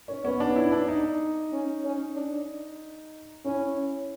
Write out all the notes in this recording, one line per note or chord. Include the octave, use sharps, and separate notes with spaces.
C#4
B3 C#4
D4
E4
D4
D#4
C#4
C#4
D4
C#4 E4